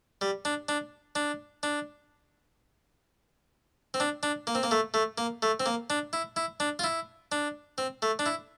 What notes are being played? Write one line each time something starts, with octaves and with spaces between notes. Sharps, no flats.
G3
D4
D4
D4
D4
C4
D4
D4
A#3
C4
A#3
A3
A3
A#3
A3
C4
A#3
D4
E4
E4
D4
F4
E4
D4
C4
A3
D4
E4